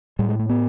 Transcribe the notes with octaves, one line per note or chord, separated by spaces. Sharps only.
A2 G3
G#3
A3
B3